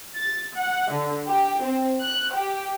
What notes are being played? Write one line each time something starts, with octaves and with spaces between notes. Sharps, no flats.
A6
F#5
D3
G4
C4
F#6
G4